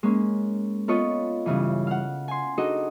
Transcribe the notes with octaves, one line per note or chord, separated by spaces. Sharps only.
G#3 A#3 C#4
B3 F4 A4 B4 C#5 D#5
G2 C#3 E3
F5 F#5
G#5 C6
D4 D#4 F#4 G#4 A4 D#5